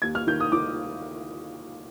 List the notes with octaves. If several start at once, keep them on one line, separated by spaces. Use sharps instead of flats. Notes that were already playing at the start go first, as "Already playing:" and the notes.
D#2 G#6
F6
D#3 G6
D#6
D#3 D6